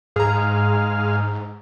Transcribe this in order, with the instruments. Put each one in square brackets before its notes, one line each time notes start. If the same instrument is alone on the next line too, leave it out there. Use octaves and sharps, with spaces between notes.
[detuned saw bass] G#2 [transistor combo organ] G#3 F5 [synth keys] G#4 A#5